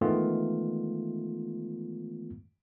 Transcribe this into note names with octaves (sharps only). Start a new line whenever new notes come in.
D#3 E3 G#3 A3 B3 F4